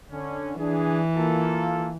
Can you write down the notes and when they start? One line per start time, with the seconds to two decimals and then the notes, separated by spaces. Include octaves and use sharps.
0.11 D3 C#4
0.58 E3 D4 G#4
1.17 A#3 F4 A4